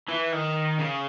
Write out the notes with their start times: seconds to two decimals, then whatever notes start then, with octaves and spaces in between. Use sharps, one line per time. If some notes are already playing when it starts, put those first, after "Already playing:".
0.08 E3
0.32 D#3
0.78 C#3